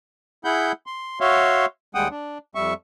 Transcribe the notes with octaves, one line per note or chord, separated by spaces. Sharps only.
E4 G#4 F#5 B5 G6
C6
F#4 C#5 E5 F5 C6
D#2 G3 G#3 F#5 G5 D#6
D4
F2 G3 E5 C#6